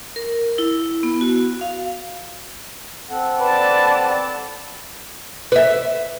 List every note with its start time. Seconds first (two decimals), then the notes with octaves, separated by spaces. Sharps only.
0.16 A#4
0.58 E4
1.03 B3
1.21 F#4
1.61 F5
3.10 C4 A4 F#5
3.40 B4 D5 A5
5.52 B4 E5